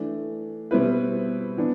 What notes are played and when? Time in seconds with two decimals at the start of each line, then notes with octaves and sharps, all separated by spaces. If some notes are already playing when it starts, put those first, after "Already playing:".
Already playing: E3 A3 D4
0.71 B2 G3 C4 E4 B4
1.57 E3 B3 D4